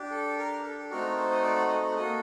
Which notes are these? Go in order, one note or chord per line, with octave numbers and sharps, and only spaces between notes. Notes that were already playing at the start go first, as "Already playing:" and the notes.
Already playing: D4 G4
A4
A#4
A4
A4
A3 C4 D#4 F#4 A4 A#4
C5
D#5
D5
F#5
D#5
F#5
A#3 F#4 A4 D#5